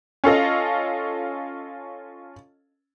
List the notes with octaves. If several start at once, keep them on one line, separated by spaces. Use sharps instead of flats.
C#4 F4 A4 D#5